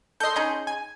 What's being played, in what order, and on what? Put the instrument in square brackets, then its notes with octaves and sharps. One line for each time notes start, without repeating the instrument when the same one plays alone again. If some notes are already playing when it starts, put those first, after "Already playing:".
[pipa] A4 D#5 [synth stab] C6 G6
[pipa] C#4 D#4 G#4
[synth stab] G#5